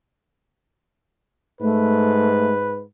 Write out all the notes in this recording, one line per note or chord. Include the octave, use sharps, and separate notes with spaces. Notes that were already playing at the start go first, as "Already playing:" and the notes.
G#2 A3 B4